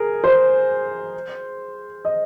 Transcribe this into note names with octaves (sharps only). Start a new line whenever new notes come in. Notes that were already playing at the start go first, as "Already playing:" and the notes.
Already playing: G#4 A#4
C5
D#5